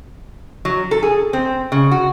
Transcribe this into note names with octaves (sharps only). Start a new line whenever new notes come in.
F#3
A4
G#4
C4
C#3
F#4